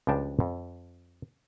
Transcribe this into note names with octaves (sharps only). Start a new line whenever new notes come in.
C#2 F3 G3 D4 G5 A5
F2